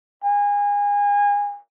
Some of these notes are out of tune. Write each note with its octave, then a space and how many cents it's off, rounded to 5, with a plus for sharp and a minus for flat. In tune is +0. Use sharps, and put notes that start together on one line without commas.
G#5 -30